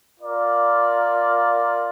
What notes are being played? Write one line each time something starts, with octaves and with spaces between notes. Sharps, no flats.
F4 A#4 D5